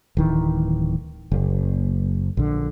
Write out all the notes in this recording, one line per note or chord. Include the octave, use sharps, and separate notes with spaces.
D1 D#3 E3
F#1
A#1 D3